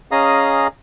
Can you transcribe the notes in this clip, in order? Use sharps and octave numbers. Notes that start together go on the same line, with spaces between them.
C#4 G#4 D#5 F5 A#5 D#6